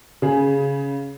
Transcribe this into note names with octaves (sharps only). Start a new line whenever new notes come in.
C#3 G#4